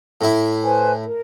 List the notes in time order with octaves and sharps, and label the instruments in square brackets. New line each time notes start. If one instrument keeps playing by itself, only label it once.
[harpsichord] A2 E4
[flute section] B4 C5 G#5
A#4